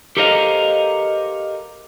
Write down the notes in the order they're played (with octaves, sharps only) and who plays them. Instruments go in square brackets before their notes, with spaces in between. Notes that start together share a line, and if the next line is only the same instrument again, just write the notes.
[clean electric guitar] G4 A4 A#4 C5 D#5 F5